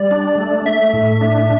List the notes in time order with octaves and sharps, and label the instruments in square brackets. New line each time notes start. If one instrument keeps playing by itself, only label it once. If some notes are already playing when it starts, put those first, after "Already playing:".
Already playing: [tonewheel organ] G3 [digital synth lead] D5
[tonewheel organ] D4
A3
[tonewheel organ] A3 [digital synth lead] E5
[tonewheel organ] A2
D4